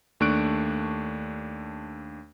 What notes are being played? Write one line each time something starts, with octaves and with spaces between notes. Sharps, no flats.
D#2 A3 D4 C#6 F#6 D7